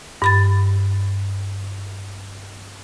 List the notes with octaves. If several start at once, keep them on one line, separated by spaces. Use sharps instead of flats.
G2 B5 A6